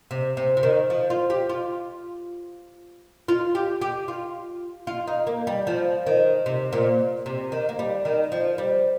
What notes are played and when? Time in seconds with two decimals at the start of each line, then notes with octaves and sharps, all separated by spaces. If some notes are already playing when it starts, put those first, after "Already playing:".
0.11 C3
0.37 C3
0.57 C3
0.63 D#3
0.90 F3
1.10 F4
1.30 G4
1.49 F4
3.28 F4
3.55 G4
3.81 G4
4.08 F4
4.87 F4
5.07 D#4
5.27 A#3
5.47 G3
5.67 F3
6.07 D#3
6.46 C3
6.73 A#2
7.26 C3
7.52 D#3
7.69 A#3
7.79 G3
8.05 D#3
8.32 F3
8.58 G3